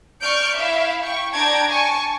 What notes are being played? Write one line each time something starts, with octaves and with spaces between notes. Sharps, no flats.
D5 C#6 F6 G6 D7
E4 E5 F5
G5 C#6
D4 G5 A5 A#5 G#6 D7
G#5 A5 C#6